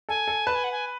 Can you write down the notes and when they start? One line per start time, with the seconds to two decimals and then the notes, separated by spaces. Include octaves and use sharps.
0.09 A4 G#5
0.28 A4
0.46 B4 A5
0.55 G#5
0.64 F#5
0.72 G#5